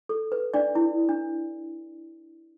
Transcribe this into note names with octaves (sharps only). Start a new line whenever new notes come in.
A4
B4
D4 D5
E4
D4